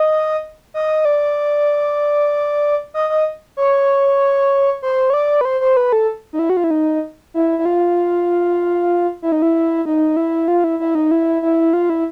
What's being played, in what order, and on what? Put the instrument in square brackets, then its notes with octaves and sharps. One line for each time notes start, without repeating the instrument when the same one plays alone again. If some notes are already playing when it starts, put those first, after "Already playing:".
Already playing: [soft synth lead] D#5
D#5
D5
D#5
D#5
C#5
C5
C#5
D5
B4
C5
C5
B4
A4
D#4
E4
F#4
F4
E4
D#4
E4
E4
F4
E4
D#4
E4
D#4
E4
F4
E4
E4
D#4
E4
E4
F4
E4